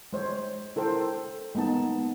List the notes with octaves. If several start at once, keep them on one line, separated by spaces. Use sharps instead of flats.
G#3 C5 C#5
E4 A4 A#4 C5 G5
G#3 A#3 B3 D#4 A5